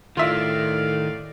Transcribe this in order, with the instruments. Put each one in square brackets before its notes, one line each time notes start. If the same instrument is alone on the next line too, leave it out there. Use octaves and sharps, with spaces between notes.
[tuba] A2 [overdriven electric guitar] D#3 [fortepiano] F4 E5 [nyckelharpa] D5 F5